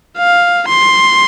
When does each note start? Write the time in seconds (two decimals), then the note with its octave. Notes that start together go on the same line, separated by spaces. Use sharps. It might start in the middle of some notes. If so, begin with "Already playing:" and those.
0.18 F5
0.69 C6